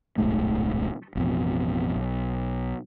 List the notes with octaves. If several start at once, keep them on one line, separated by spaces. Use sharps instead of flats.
D1 B1 G#2 A3
A1 F2 B2
B1